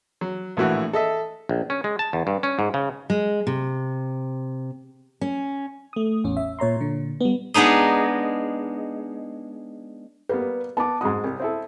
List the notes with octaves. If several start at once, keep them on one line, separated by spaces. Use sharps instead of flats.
F#3
A#1 A2 E3 F#4
A4 D#5 E5
A#1
C#4
G#3
A5
E2
G2
C#4
G#2
C#3
G#3
C3
C#4
A3 D#6
A1 E2 C#4
E5
A#2 C#5 A#5 C6
A#2 D3
G3 B3
G#3 B3 D4 D#4 D#5
G3 A#3 B3 B4
B3 A5 D6
G#2 G#3 F#4 D#6
C2
C4 E4 A4